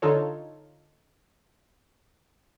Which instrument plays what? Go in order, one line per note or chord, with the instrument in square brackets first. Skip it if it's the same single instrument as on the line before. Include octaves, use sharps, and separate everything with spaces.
[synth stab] D3 D#4 F4 A4 C#5